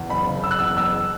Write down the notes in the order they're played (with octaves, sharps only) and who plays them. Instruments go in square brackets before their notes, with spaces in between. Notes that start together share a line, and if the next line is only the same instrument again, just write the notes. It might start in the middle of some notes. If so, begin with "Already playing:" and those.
Already playing: [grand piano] E2
F#1 B5
C#3
F#1 E6
F#6
E2 E6
F#1 E6